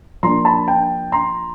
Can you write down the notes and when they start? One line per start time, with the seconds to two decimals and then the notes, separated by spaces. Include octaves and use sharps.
0.23 F3 A#3 D4 A#5 C6
0.45 A5 B5
0.68 G5 A5
1.12 A#5 C6